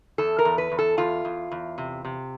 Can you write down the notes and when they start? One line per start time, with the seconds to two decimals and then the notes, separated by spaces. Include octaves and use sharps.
0.18 E2 A4
0.39 A#4
0.45 E2
0.58 B4
0.72 E2
0.79 A4
0.98 E2 F4
1.25 E2
1.51 E2
1.78 C3
2.05 C3